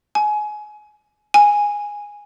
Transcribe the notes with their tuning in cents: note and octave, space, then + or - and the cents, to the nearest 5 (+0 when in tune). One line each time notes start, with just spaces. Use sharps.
G#5 +25
G#5 -10